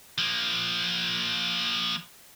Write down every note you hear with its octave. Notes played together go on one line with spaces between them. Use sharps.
F3 A#3